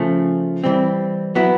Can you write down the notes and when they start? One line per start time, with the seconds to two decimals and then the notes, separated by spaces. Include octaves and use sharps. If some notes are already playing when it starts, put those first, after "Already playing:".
Already playing: C#3 F3 A3
0.64 E3 G3 C4
1.35 F#3 B3 E4